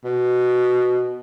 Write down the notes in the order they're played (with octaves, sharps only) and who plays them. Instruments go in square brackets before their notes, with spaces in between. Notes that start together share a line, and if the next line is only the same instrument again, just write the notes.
[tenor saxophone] B2